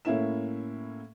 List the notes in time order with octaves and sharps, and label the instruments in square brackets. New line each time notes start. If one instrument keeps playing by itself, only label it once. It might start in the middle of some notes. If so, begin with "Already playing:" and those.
[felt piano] A2 A#3 C#4 E4 E5 E7